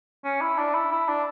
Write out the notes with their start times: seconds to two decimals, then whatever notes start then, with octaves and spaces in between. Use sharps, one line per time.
0.24 C#4
0.41 E4
0.58 D4
0.74 E4
0.92 E4
1.08 D4